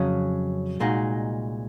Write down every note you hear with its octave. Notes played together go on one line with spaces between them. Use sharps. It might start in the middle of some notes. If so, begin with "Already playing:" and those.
Already playing: F2 C#3 F#3 C#4
C2 A#2 G#3 D#4 F#4